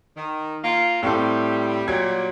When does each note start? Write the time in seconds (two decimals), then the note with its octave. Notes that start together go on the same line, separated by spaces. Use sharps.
0.16 D#3
0.63 A#3 F4
1.03 A2 G3 C4 A4
1.88 A#2 F#3 G3 G#6